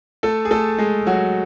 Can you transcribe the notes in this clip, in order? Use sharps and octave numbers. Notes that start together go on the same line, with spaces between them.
A3 A4
G#4
A3 A4
G#3 G#4
F#3 F#4